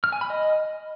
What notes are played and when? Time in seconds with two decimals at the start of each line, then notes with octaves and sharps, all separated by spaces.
0.04 F6
0.12 G#5
0.21 B5
0.30 D#5